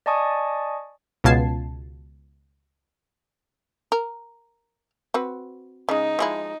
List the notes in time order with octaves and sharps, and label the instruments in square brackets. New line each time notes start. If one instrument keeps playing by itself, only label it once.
[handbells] D5 D#5 G#5 A5 C#6 D#6
[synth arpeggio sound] C#2 B2 F4 A5 G#6 C7
[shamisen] A#4
C4 F#4 B4
[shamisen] C#3 G#3 [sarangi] D#4
[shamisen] F3 G#3 E4